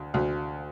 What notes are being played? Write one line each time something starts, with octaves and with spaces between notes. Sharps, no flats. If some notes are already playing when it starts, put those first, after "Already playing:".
Already playing: D2
D2